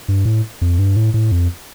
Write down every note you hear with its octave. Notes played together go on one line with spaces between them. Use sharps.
G2
A2
F2
G2
A2
A2
F2